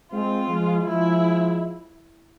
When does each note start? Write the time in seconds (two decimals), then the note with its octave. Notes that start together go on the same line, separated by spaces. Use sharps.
0.12 G#3 C4 F4
0.48 F3 G#3
0.83 F3 G#3 E4